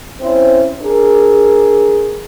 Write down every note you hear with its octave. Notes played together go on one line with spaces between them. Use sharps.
C4 C#4 E4 C5
D4 G#4 A#4